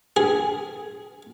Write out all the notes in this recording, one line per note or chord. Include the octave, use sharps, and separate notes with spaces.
G#4